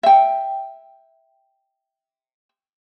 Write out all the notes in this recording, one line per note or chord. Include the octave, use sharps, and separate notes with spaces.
E5 G5